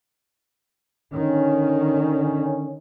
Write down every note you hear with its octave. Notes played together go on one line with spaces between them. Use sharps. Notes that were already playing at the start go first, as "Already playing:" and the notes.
D3 D#3 C#4